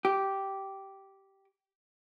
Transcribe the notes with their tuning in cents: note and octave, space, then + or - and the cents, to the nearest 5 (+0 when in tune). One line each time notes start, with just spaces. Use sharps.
G4 -10